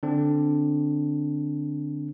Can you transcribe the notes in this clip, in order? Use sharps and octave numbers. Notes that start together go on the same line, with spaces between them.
D3 C4 D4